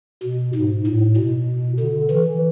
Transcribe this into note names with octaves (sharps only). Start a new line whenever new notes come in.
B2
G#2
A2
B2
D3
E3